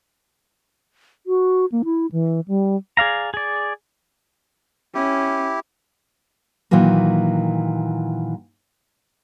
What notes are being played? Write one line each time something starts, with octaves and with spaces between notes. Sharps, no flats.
F#4
A#3
E4
E3
G3
G#4 D5 F5 A#5
G#4 D5
C#4 E4 G4
A#2 D#3 E3 F#3 A#3